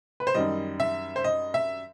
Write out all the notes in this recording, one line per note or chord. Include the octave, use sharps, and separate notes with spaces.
B4
C5
F#2 D#3 G3 D#5
E5
C5
D#5
E5